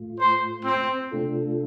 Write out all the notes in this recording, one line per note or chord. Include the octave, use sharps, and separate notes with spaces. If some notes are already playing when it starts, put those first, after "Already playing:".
Already playing: A2 A3 F4
C5
C4
C3 A3 D4 F4 A4